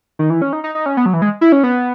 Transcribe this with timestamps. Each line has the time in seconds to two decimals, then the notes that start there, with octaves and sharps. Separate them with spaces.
0.19 D#3
0.30 E3
0.42 C#4
0.53 D#4
0.64 D#4
0.75 D#4
0.86 C#4
0.97 B3
1.06 F#3
1.14 E3
1.22 G#3
1.41 E4
1.52 C#4
1.63 B3